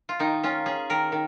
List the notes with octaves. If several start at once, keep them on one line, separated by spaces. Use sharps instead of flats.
F4
D#3 D#4
C#4 F4
C#4 G#4
D#3 A#4
D#3